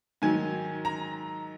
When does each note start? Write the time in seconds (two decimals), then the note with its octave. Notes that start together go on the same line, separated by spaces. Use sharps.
0.22 G#2 D#3 F#3 G#5
0.85 A#5